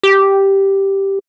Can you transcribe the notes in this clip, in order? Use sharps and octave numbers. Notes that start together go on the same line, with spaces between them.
G4